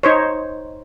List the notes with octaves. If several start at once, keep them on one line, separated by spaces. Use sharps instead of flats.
D#4 C5 C#5